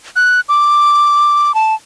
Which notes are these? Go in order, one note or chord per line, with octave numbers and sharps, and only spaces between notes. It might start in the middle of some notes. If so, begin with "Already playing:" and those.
F#6
D6
A5